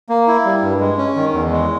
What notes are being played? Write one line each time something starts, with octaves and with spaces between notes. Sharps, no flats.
A#3
E4
G3
G2
G#3
C#4
D#3
E2
G#3